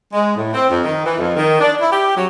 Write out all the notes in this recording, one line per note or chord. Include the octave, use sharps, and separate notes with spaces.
G#3
A2
C4
F2
D#3
E3
F2
D#3
D4
E4
G4
F#3